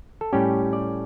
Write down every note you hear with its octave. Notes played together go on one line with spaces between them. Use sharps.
A4
A2 G3 C#4 G4
D5